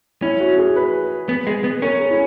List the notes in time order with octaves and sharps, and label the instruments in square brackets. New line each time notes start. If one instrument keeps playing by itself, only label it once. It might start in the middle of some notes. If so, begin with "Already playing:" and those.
[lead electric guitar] C#4 [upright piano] E4
[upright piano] F#4
G#4
B4
[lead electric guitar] B3
G#3
B3
[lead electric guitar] C#4 [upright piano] A#4
[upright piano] G#4
E4